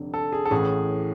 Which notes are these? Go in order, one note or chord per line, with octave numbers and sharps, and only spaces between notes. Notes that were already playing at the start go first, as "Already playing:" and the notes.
Already playing: F1 F2 D3
A4
G#4
A4
A1 A2 E3 G#4